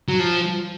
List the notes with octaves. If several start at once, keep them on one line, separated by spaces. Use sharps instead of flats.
F#3
F3